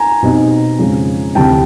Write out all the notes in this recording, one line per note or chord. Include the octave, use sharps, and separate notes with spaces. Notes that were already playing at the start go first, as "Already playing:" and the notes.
Already playing: G#5 A#5
B2 G3 C4 D#4
F2 C#3 F3 G#3
D2 C3 E3 G3 G5 A5